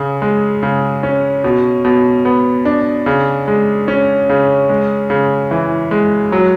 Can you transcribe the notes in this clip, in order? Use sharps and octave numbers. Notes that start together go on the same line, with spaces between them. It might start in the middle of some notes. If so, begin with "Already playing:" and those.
Already playing: C#3
G#3
C#3
C#4
B2
B2
B3
D4
C#3
G#3
C#4
C#3
G#3
C#3
E3
G#3
F#3